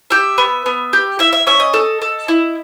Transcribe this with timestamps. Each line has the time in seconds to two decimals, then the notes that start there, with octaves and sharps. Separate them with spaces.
0.10 G4 E5
0.38 B3
0.66 B3
0.93 G4
1.19 E4 E5
1.33 E5
1.47 C#4 E5
1.60 D#5
1.74 A4
2.02 A4
2.28 E4